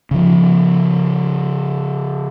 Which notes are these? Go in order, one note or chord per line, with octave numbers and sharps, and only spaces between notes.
C#3 F3